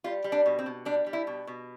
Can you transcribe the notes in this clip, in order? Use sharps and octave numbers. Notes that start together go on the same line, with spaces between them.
G3 F4
G3
D4
B2
C4
B2
G3 D4
G3
E4
B2
B2